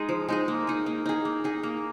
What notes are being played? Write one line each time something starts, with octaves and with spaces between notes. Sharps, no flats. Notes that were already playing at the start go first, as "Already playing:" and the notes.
Already playing: G#3 D#4 G#4
F3
G#3 D#4 G#4
A#3
D#4 G#4
A#3
D#4 G#4
A#3
D#4 G#4
A#3